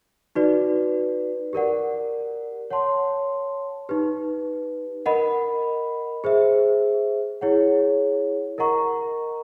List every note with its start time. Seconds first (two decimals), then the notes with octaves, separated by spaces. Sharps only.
0.35 D#4 F#4 B4 D5
1.53 G4 A#4 D5 F#5
2.70 C#5 F#5 A5 C6
3.89 D#4 G4 B4
5.06 A#4 D#5 F#5 B5
6.24 G#4 C5 E5
7.41 E4 G#4 C#5 F#5
8.58 A#4 D#5 F#5 A#5 C#6